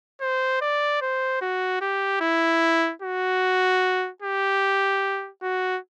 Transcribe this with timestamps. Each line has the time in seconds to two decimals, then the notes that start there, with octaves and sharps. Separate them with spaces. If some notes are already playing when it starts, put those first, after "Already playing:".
0.21 C5
0.61 D5
1.01 C5
1.41 F#4
1.81 G4
2.21 E4
3.02 F#4
4.22 G4
5.42 F#4